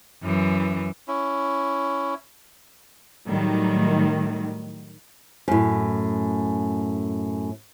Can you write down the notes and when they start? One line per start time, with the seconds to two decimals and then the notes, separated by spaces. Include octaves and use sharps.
0.23 F#2 E3
1.08 C#4 E4
3.28 A2 D#3 F#3 G3
5.48 F#2 A2